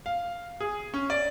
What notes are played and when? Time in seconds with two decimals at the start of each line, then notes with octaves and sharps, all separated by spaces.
0.06 F5
0.60 G#4
0.94 C#4
1.10 D5